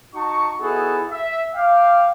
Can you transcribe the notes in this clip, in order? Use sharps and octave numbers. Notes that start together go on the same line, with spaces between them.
D#4 F#4 A5 C#6
B3 D#4 E4 F#4 G#4 A4
E5
F5 G5 D6